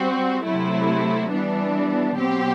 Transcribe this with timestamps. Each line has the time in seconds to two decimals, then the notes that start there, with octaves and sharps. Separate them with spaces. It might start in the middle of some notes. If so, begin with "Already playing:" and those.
Already playing: G3 C4 F#4
0.44 C3 F#3 A3 E4
1.31 E3 G3 B3 D4
2.17 B2 F#3 C4 G4